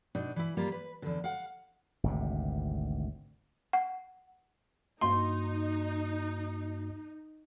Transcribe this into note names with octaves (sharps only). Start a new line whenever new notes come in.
B2 D4 D#4
E3 E4
G3 A#3 F4
B4
E2 D3
F5 F#5
G#1 D2 C3
F#5
G2 A#3 D#4 F#4 C6